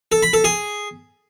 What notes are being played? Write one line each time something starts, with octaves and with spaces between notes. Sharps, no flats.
A4
B5
A4
G#4